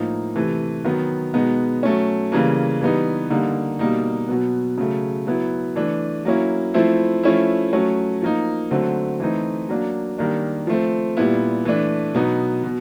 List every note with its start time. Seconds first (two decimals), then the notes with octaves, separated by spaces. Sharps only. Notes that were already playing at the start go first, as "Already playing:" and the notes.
Already playing: A2 F3 A#3 D#4
0.36 C3 E3 A3
0.84 D#3 F#3 B3
1.34 B2 G#3 B3 D#4
1.83 F#3 A3 C#4
2.32 C#3 E3 G3 A#3
2.81 E3 G3 B3 D#4
3.30 D3 G3 A#3 D#4
3.79 B2 G3 A#3 D#4
4.28 B2 F#3 B3
4.78 C#3 F#3 A3
5.27 F#3 B3 E4
5.76 E3 A3 D4
6.25 F#3 A#3 C#4 E4
6.74 F3 A3 C4 E4
7.23 F3 A3 C#4 E4
7.73 F#3 A3 C#4
8.22 F3 A#3 D#4
8.71 D3 F#3 A3 C4
9.20 E3 A3 C4 D#4
9.69 F#3 A#3 D4
10.18 D#3 G3 A#3 D4
10.67 F3 A3 C4
11.17 A#2 G3 B3 E4
11.65 E3 A3 D4
12.15 B2 F#3 B3 D#4
12.64 B2